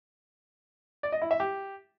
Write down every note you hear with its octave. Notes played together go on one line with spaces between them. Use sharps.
D5
D#5
E4
E5
G4